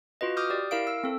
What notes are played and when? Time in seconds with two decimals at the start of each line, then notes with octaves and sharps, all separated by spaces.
0.21 F4 F#4 B4 D#5
0.37 D6 D#6 F6 G6
0.50 G4 D5
0.71 E4 A#4 F5 D7
0.87 E6
1.04 C4 A4